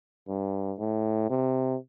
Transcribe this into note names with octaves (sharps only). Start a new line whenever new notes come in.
G2
A2
C3